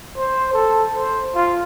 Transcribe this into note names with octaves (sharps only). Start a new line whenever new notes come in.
C5
A4
C5
F4